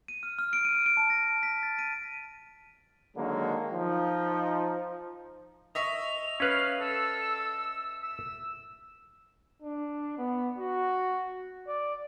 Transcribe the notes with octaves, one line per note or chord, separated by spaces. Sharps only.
D#7
F6
F6
D7
D#7
D7
A5
A#6
A#6
B6
A6
D#7
D3 D#3 F#3 G#3 A#3
F3 D#4
D#5 E5 C#6 F7
C#4 B4 F5
A4 E6
E6
D4
B3
F#4
D5